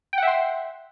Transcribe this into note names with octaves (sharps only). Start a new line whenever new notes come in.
E5 F#5 G5 C6